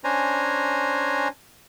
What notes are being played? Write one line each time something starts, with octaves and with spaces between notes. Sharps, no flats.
C#4 D4 C5 G#5 A#5